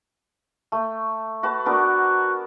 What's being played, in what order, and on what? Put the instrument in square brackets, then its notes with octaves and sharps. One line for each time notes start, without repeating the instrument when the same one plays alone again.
[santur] A3
F#4 B4 A5
[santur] B3 D4 A#4 [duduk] F#4